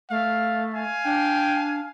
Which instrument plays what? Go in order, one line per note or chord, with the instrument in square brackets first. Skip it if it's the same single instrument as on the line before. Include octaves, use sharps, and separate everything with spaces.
[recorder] A3 [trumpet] F5
[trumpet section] F5 G#5
[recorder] D4 [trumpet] G5